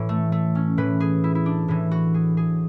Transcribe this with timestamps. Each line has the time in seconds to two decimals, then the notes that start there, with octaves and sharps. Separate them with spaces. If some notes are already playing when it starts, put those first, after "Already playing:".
Already playing: A2 E3
0.09 A3
0.32 A3
0.55 C#4
0.77 A2 E3 B4
1.00 G#4
1.24 E4
1.35 E4
1.46 D4
1.68 A2 E3 E4
1.91 F#4
2.14 G#4
2.37 G#4